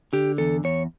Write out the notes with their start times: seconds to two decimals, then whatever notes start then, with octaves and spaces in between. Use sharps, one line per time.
0.13 D3 G4
0.38 E2 A4
0.64 E2 C#5